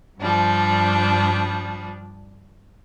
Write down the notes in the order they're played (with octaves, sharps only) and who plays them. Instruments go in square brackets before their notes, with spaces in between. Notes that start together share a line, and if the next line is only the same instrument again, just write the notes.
[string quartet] G2 F3 G3 D4